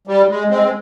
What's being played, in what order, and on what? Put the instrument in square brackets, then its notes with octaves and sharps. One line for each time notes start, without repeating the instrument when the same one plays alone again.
[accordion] G3
G#3
G#3 C4
G#3